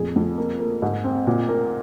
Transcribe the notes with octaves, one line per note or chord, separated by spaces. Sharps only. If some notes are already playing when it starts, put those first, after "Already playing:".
Already playing: F2 A#2 G#4
F2
A#3
A#3
G#2
C4
A#2
A#3